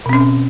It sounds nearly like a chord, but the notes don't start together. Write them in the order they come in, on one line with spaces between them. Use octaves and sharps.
B2 C4 C#4